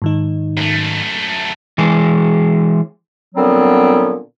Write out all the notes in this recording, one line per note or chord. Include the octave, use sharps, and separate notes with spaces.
G#2 D#3 D#4
F#2 A3
E3 G#3 G#4
A#2 D3 F#3 G3 B3 C4